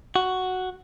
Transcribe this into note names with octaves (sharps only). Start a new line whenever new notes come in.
F#4